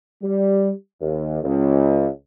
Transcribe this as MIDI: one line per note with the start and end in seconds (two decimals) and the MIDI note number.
0.22 0.70 55
1.01 1.40 39
1.43 2.07 37